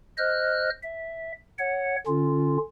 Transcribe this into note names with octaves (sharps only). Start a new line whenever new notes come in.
C5 D#5 F6 F#6
E5
C#5 F#5
D3 C#4 F4